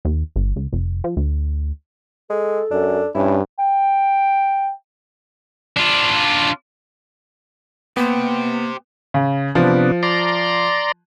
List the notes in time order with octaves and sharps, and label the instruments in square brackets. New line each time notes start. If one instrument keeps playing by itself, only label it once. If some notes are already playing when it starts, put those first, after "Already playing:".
[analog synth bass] D#2
G1
C#2
F1
F3
D2
[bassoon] G#3 [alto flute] A4
[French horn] F#2 [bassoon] D4
[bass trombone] G2 [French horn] C#4 [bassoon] E4
[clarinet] G5
[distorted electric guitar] D4 F4
[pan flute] A#3 [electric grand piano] B3 [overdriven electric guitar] G4 C5
[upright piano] C#3
[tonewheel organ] C3 B3 D4 [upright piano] F3
[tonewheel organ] D5 A#5 C6